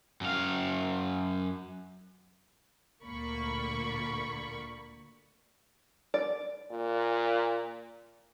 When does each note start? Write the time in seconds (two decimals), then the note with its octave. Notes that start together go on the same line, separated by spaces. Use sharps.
0.21 F#2 F5
3.02 D2 A#2 A#3 D5 B5 C#6
6.14 D5
6.71 A#2